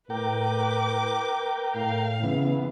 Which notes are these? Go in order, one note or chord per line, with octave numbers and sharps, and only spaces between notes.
A2 A#4 B4 G5 D6
A2 F5
C#3 E3 B3